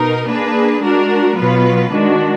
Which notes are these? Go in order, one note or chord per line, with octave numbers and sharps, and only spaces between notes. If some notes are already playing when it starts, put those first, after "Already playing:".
Already playing: B2 D#4 A#4
A#3 D4 G#4 B4
G#3 D4 F#4 A#4
B2 F#3 B3 F4 B4
D#3 G#3 D4 F#4